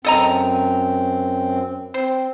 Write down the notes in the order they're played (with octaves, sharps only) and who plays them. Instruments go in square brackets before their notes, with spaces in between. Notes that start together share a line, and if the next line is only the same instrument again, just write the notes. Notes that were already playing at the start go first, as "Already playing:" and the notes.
[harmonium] F#2 C4 [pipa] A4 D#5 A#5
[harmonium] C4 [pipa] C5